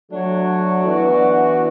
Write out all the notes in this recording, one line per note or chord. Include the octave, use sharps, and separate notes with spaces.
F#3 A3 D4 F#4 C#5
E3 B3 D4 F#4